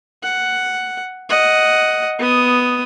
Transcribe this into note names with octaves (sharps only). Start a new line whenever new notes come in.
F#5
D#5 F#5
B3 D#6